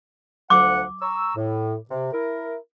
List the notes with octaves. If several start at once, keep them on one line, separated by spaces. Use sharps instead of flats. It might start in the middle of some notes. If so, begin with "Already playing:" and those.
D2 F3 F#5 D6
A#5 C#6 E6
A2
C3
E4 A#4